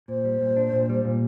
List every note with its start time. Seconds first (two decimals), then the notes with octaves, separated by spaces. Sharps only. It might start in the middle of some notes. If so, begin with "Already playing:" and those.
0.08 A#2 C5
0.25 G3
0.41 A#2
0.56 D4
0.73 A#2
0.90 G3
1.05 A#2